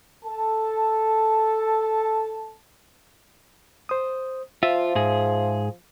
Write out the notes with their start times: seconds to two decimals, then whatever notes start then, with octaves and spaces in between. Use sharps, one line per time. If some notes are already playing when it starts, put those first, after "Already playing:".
0.25 A4 A5
3.89 C5 D#6
4.63 F3 F4 E5
4.95 G#2 G#4